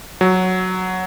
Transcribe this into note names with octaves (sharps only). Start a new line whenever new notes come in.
F#3